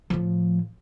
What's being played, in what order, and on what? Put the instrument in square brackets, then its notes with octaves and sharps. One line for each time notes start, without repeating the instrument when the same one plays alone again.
[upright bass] A2 F3